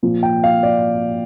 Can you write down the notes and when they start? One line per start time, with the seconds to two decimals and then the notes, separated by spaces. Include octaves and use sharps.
0.03 A#2 F3
0.23 G5
0.44 F5
0.63 D5